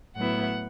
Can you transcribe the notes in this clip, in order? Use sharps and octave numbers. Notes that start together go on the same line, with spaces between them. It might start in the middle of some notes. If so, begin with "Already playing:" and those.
A2 F#3 B3 E4 F#5